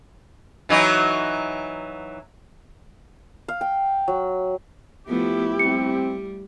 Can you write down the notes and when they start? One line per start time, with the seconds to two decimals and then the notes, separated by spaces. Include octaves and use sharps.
0.69 E3 F#3 D#4
3.48 F5
3.61 G5
4.08 F#3
5.08 F3 A3 B3 E4 G4
5.59 G3 C4 C#7